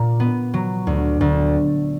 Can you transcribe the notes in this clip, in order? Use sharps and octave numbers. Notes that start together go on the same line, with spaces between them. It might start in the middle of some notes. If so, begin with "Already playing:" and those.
Already playing: A#2
B3
F#3
D2
D2